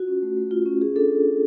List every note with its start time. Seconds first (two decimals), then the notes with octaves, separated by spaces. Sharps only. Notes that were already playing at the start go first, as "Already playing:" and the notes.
Already playing: F4 F#4
0.08 C#4
0.22 A3
0.37 A3
0.51 F4
0.66 C#4
0.82 F4 G#4
0.96 D4 A4